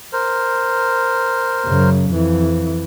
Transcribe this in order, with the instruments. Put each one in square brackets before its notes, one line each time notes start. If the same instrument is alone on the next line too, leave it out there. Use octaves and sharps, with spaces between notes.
[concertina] A#4 C5
[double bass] F#2 C#3
F2 E3